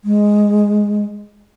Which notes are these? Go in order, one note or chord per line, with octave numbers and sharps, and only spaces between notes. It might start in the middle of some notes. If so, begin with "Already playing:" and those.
G#3